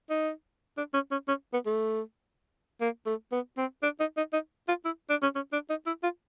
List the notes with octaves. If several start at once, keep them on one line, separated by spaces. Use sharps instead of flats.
D#4
D4
C#4
C#4
C#4
B3
A3
A#3
A3
B3
C4
D4
D#4
D#4
D#4
F4
E4
D4
C#4
C#4
D4
D#4
E4
F4